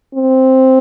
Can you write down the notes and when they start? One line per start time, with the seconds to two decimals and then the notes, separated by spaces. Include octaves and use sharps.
0.15 C4